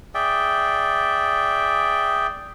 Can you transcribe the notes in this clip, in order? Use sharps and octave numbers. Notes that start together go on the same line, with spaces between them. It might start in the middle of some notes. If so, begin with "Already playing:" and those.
G#4 D5 E5 G5